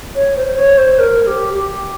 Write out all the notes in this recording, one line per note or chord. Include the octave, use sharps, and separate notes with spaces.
C#5
C5
C5
C#5
C5
A#4
G4
G4